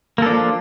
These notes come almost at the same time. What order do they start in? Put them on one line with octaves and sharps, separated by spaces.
A#3 A4 D4 F3